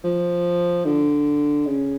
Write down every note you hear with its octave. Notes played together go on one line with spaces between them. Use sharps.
F3
D3
C#3